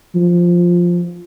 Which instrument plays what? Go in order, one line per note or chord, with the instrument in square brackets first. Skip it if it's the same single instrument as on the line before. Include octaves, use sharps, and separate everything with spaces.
[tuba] F3